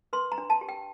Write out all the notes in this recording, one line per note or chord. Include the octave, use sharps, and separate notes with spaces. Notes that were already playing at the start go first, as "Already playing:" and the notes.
B4 C6
A#5
D4
A5
G4
G5